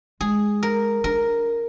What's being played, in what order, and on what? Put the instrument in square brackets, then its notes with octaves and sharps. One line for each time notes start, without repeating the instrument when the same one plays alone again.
[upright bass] G#3 [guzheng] G#4
[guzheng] A#4
[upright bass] D4 [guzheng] A#4